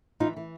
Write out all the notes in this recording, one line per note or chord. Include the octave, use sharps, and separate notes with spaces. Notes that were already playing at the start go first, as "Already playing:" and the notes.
E3 D#4 F4
E3